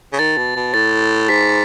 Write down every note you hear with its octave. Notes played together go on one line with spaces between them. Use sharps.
C#3
D#3 A6
B2
B2
A2 A6
G#2 B6